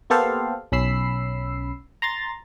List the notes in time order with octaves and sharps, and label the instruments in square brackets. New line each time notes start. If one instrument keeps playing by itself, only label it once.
[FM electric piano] A#3 B3 G4 A4 C5 F5
B1 C#4 B5 E6 C7
A#5 C6 A6